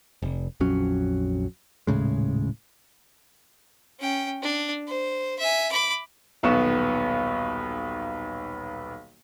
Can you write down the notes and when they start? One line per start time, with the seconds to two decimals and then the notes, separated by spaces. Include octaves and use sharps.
0.22 F1
0.60 A#1 F2 F#3 C#4
1.87 D#1 A2 C#3 G#3
4.00 C#4 G5
4.42 D4
4.88 C5
5.39 E5 G#5
5.71 B5 D6
6.43 D#1 B1 B3 C#6 E7